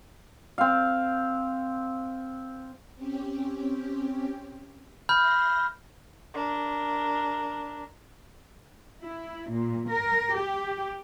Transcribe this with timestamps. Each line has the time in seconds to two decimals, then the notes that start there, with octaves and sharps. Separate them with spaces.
0.58 C4 F5
2.96 C4 C#4 G4
5.09 E5 B5 C6 F6 G6 A#6
6.34 D4 A#4
9.02 E4
9.50 A#2
9.89 A#4
10.35 G4